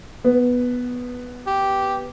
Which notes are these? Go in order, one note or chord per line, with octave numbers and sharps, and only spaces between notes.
B3
G4